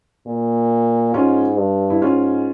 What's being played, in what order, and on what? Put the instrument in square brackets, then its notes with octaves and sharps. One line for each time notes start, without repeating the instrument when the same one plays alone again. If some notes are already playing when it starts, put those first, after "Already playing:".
[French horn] A#2
[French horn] G#2 [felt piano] C#4 F4
[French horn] G2
[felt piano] E4
[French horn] G#2 [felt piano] C#4 F4